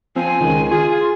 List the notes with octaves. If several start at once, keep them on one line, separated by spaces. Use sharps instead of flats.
F3 C4 G#5
C#2 D#3
F4 G#4